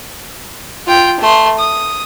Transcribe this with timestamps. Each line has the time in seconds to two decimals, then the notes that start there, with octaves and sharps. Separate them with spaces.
0.87 F4 G5
1.20 A3 C6
1.59 D#6